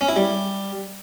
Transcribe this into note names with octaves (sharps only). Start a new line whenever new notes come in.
C#4
E4
G3